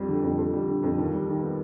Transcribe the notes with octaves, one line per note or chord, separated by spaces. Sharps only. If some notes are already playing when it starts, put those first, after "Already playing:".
Already playing: F2 G3
D3
F2
F2
G3
D3
F2
D#2
G3
D#3
B3